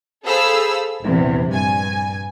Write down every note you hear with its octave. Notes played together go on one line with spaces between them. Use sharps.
G#4 A4 C5 F5 B5 E6
A#1 E2 C3
G2 G#5